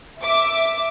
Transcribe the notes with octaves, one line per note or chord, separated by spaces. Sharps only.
E5 D6